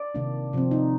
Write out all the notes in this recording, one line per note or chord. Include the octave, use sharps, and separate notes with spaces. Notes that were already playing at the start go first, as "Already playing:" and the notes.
Already playing: D5
C3 D#3 A#3 D4
C3 F3 C4
D#4